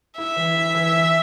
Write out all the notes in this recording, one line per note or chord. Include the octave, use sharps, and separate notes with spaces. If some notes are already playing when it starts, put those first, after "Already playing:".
E4 E5
E3
E4
E3
E3